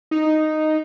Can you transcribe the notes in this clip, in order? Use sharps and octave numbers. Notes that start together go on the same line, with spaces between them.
D#4